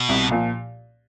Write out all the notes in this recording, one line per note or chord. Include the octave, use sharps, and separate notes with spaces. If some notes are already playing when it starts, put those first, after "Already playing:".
Already playing: B2
C2
A#2 F3